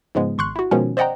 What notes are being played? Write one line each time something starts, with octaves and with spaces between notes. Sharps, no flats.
G#2 C#3 F3 G#3 B3
G#1 C6 C#6 F#6
E4 F#4
B2 D#3 F3 G#3 B3 C#4
C5 D5 D#5 F#5 G5 A#5